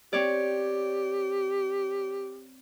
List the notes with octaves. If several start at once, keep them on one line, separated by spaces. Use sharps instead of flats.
C4 G4 C#5 D5